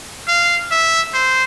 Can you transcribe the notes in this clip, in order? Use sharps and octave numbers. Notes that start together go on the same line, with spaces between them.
F5
E5
C5